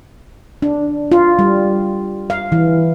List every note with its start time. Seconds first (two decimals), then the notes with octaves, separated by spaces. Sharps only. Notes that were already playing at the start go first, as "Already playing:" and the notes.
0.62 D4
1.12 F4
1.39 G3
2.30 F5
2.52 E3